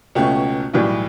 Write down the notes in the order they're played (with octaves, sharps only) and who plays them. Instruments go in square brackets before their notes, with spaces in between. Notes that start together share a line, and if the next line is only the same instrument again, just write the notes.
[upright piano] C#2 B2 A3 C#4 G4
B1 A2 E3 G3